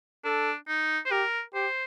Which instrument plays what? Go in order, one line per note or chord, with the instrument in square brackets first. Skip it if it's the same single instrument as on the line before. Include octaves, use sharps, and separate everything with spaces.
[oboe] D4 [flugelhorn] A4
[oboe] D#4
C5
[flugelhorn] G4 [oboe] A#4
[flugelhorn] G4 [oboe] C5